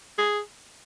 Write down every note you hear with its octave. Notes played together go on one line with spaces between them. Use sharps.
G#4